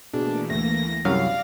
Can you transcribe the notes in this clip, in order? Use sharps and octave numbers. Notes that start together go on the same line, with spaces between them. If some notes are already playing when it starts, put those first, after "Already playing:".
B2 E3 A3 A#3 D4 G#4
D2 A#6
C2 F#2 F#3 C#4 G4 D5 F5 A#6